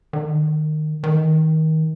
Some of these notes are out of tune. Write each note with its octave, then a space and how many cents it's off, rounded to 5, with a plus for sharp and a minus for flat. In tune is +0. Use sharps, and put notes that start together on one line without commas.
D#3 -20
D#3 +25